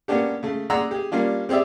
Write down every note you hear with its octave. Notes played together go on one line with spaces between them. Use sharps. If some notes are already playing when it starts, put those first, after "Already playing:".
A#3 B3 C#4 D4 G4
C#3 A3
G#4 D5 F#5 A#5 C6 E6
G4 G#4
G3 A#3 C#4 D4 F4
C4 G4 G#4 D5 E5